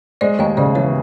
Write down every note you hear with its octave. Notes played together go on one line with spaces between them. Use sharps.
G#3 C5 D5
D#2 C#5 D#5
C#3 C5 D5
E3 B4 C#5